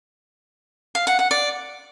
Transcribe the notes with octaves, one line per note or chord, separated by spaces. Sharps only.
F5
F#5
F#5
D5